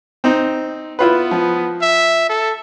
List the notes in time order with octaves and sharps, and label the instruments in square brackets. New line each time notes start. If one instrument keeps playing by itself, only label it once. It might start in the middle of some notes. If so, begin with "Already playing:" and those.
[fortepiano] C4 D#4
[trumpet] B3 [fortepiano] E4 F4 B4
[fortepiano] F3
[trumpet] E5
A4